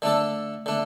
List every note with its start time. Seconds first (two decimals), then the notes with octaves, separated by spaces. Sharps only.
0.02 D3 A3 D4 A4
0.66 D3 A3 D4